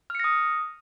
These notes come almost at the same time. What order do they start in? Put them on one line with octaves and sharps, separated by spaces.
F6 C#7 A#6 D#6